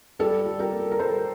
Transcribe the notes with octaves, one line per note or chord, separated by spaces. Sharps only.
G3 A4
G3
G4 A#4
A#3
A#4
G3 A4 C5